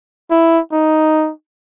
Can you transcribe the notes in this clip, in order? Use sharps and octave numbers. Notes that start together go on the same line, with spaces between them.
E4
D#4